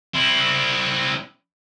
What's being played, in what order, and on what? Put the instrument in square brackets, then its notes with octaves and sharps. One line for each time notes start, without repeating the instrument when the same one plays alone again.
[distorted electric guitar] C4 E4